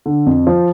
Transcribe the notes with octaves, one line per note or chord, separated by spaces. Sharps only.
D3
F2
F3